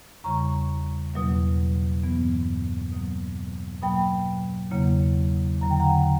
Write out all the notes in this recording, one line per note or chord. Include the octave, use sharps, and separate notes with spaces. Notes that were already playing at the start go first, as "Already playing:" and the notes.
E2 C#3 G3 A#5 C#6
E2 B2 F#3 A#3
G2 E3 B3
B2 F#3 A#3
B2 F#3 A#3 G5 B5
E2 C#3 F#3 A#3
E2 D3 F#3 A#5
G5
F#5 A#5